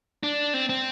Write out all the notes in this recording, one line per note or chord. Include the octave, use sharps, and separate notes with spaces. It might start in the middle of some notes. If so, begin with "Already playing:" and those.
D4
C4
C4